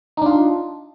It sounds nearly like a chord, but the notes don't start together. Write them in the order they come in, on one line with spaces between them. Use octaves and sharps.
D#4 D4 F4